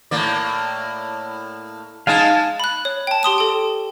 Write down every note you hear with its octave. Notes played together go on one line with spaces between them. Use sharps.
A2 A#3 D5
G#3 D#4 F5 G#5 A5
B5 F#6
C#5
G5 A5
G4 C6 D#6 E7
A4 G5